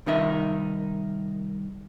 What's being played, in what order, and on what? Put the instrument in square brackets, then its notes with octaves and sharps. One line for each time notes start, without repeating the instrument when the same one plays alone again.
[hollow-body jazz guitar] C2 D#3 D#4 E5